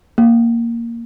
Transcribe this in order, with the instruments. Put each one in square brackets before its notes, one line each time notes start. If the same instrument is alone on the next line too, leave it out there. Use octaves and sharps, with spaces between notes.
[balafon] A#3